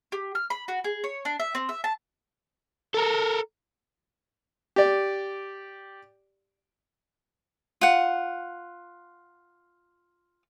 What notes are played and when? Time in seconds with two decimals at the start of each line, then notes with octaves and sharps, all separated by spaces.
0.12 G4
0.35 F6
0.50 B5
0.68 F#4
0.84 G#4
1.04 C#5
1.25 D4
1.40 E5
1.55 C4
1.69 E5
1.84 A5
2.95 A4 A#4
4.76 G4 D5
7.81 F4 F#5